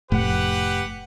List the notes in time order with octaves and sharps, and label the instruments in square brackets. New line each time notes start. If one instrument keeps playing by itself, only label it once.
[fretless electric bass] F1 A2 [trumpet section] G4 B4 F#5